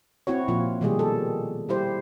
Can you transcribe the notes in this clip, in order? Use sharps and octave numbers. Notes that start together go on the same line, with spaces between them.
C4 E4 F#4 C#5
A#2 F3 F4
B2 D#3 G3 G#3 G4 G#4
A4
G3 E4 G4 C5